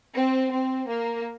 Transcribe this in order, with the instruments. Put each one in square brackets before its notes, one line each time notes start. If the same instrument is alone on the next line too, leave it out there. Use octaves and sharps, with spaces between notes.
[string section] C4
C4
A#3